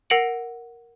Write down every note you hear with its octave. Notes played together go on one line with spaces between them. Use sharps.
A#4 F#5 A#6 C#7 D7 F#7